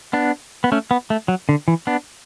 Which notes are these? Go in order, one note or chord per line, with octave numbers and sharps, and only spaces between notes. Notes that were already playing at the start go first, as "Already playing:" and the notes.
B3 D4
B3
A3 C#4
B3
A3
F#3
D3
E3
B3 D4